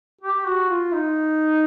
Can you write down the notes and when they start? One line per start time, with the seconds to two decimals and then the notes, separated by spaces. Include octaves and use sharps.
0.21 G4
0.45 F#4
0.69 F4
0.93 D#4